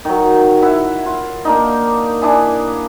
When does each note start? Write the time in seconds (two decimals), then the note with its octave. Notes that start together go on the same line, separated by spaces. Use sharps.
0.05 D#3 F#3
0.62 E4 E5 F#5
1.06 F4
1.45 A#3 D4 D#4
2.21 D4 E4 G#4